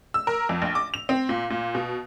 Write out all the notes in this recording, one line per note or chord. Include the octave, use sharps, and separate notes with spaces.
E6
A#4
F2
A#1
D6
F7
C4
A#2
A#2
B2